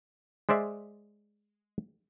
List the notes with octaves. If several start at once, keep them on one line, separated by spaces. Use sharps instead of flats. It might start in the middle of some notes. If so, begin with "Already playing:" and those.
G#3 C5 D5 E5